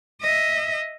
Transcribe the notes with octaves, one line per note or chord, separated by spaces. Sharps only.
D#5 E5